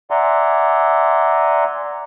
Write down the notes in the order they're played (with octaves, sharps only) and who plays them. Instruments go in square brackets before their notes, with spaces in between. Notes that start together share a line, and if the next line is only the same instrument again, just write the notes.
[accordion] D5 E5 F#5 G#5 A#5 C6